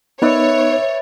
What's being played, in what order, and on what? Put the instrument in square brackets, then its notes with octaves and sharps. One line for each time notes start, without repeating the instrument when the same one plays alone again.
[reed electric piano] B3 D#4 F#6 [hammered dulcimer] B4 D5 E5 [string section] C#5